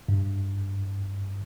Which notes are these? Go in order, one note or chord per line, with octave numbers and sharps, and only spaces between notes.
G2